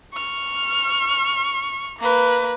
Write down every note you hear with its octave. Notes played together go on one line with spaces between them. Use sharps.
C#6 F6
A#3 B4